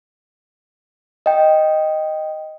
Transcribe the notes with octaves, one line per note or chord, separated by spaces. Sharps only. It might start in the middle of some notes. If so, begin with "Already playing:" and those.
D#5 G5